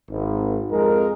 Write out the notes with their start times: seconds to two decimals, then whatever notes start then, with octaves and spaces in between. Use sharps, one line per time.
0.10 G#1
0.71 F2 G#3 A#4